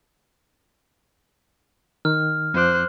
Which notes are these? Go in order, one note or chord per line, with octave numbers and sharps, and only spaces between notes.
D#3 F6
F2 F3 C5 D6 F#6